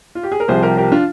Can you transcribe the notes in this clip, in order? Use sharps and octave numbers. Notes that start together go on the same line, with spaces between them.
F4
G4
G#4
A#4
C2 C3 F3 G#4 C5
G4 A#4
G4 A#4
D4 F4